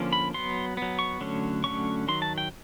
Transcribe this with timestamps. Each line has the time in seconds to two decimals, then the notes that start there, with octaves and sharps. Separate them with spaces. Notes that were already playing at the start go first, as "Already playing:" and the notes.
Already playing: D3 F3 A#3 C#4
0.13 B5
0.34 F#3 B3 C6
0.77 F#3 B3
0.99 C#6
1.21 D3 F#3 A3 C#4
1.64 D3 F#3 A3 C#4 C#6
2.08 D#3 F#3 C6
2.22 A5
2.38 G5